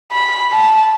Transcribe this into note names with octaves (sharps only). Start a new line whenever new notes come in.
B5
A5